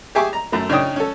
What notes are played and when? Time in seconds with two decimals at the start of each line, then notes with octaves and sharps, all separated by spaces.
0.15 G4 G#4 E5 G#5 C#6 D6
0.33 A#5
0.52 F#2 A3
0.69 C#3 D4 D#4 C#5 G5 D#6
0.96 C#4 A4